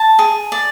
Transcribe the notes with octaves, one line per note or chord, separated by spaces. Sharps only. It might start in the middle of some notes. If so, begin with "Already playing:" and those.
Already playing: A5
G#4
D5